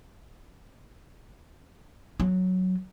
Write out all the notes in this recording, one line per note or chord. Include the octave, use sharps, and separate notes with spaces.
F#3